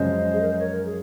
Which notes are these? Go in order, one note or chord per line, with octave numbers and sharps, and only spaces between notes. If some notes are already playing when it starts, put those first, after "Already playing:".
Already playing: F#2 C#3 F3 G#3 C#4 C5 D#5
G#4
A#4
C5
A#4 C#5
A#4
G#4